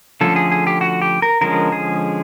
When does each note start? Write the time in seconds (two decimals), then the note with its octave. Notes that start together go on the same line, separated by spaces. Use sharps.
0.21 D3 F3 A3 C#4 A4
0.36 G#4
0.51 G#4
0.67 G4
0.81 F#4
1.02 G4
1.22 A#4
1.41 D3 F3 G#3 C#4 A#4
1.72 G#4